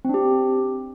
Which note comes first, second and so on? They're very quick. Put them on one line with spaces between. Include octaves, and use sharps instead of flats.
C4 D4 G4